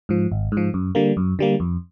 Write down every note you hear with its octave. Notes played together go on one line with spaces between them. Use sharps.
G#2 F3
G#1
G#2
F3
F#2
D3 G3 A#3
F#2
D3 G3 A#3
F2